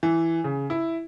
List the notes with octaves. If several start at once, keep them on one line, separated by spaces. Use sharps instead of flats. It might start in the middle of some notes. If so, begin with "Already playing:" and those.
E3
C#3
E4